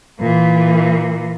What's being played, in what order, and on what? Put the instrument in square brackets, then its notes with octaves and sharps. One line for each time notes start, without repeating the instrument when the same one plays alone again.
[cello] A#2 E3